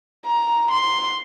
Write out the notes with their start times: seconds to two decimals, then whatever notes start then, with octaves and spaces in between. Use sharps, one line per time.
0.27 A#5
0.70 C6